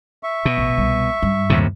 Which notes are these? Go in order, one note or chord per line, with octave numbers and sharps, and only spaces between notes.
E5 C#6
B2
A1
C2
G2
D#2 A2 C3